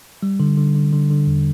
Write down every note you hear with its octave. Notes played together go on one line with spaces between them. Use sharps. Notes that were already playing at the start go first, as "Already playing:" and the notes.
G3
D3
D3
D3
D3
D3
E2